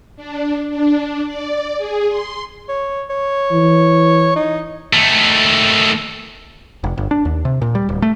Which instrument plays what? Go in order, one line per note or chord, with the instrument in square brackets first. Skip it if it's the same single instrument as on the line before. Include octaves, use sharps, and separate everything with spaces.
[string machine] D4
D4
D5
G#4
C6
[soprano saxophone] C#5
C#5
[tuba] E3
[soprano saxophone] D#4
[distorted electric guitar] D#3 A3
[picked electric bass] F1
G1
D4
D#2
C3
A#2
G3
D1
A3